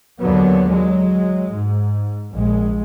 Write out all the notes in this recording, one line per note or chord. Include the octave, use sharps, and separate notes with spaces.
D#2 D3 F#3 B3
F#3 G#3
G#2
A#1 G#3